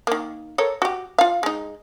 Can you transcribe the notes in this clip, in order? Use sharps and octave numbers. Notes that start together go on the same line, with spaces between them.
D#3 A#3
A4 A#4 C#5
F#4 G4
F4 F5
G#3 D#4